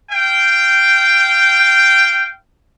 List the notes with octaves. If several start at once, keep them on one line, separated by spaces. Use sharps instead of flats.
F5 G5